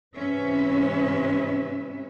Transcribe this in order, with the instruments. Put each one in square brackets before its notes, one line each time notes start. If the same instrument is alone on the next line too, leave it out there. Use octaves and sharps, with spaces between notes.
[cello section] G#2 C3 E3 C#4 B4 E5